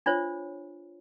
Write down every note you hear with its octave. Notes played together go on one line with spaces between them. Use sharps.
D4 F4 C5 C#5